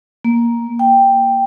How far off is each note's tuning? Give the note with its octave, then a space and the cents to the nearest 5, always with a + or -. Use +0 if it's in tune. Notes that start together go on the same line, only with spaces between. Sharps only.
A#3 +10
G5 +5